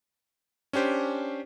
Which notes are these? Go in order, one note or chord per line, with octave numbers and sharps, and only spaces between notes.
C#4 D4 G4 C5